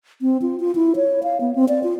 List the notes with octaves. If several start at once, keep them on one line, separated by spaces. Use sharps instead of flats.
C4
F4
F4
E4
C#5
F5
B3
C4
D5
F4